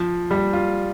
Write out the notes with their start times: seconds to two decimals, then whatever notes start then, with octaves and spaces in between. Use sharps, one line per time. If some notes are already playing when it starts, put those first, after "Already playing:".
Already playing: F3
0.31 G3
0.53 F4